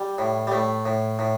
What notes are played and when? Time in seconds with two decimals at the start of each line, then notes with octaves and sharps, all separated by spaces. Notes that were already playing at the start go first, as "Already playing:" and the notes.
Already playing: G3
0.18 A2
0.47 G3
0.51 A2 A3
0.85 A2
1.19 A2